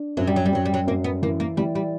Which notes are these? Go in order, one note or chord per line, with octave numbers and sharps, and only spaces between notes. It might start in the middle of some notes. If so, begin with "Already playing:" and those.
Already playing: D4
F#2 F#3
G3
F#3
G3
F#2 F#3
G3
F#3
F#2 A#3
B3
E3 A#3
A#3
E3 G3
G3